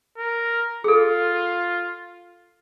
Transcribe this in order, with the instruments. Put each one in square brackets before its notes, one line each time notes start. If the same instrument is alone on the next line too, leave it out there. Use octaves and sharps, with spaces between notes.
[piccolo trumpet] A#4
[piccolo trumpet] F4 [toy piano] G#4 A4